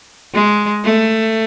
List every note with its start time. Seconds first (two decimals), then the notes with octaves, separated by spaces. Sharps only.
0.34 G#3
0.85 A3